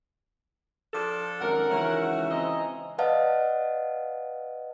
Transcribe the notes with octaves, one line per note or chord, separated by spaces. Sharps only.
F3 D4 A4
G#1 F#2 A#4 F#5
C#2 D#3 E3 C#4 F#4 E5
C4 D#5 G#5 A#5
B4 D5 D#5 F5 F#5 A5